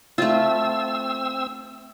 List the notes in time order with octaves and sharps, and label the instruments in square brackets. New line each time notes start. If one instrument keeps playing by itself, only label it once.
[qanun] A3 F4 [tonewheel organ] C4 E6